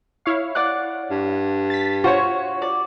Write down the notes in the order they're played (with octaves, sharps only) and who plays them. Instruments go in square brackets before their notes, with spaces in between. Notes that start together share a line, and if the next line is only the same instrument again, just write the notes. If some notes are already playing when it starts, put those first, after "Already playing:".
[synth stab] E4 C#5 F5
[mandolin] D5 F#5 F#6
[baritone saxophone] G2
[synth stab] A6 B6
[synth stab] F4 C5 C#5 [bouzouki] F#4
[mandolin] D5